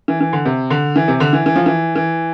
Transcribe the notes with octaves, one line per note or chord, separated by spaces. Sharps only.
E3
E3
D3
C3
D3
E3
C3
D3
E3
E3
F3
E3
E3